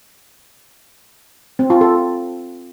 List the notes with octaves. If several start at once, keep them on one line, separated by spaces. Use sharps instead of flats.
C4
F4
A4